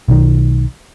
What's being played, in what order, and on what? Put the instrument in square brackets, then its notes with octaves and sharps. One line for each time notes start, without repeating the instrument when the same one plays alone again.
[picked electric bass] B1 D#3